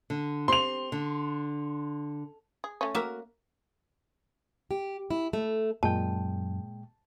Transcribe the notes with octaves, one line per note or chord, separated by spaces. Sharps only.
D3
C4 G4 C6 F7
D3
G#4
A3 C#4
A#3 F#4 A#4 E5
G4
E4
A3
F#2 A#2 G#3 G5 A5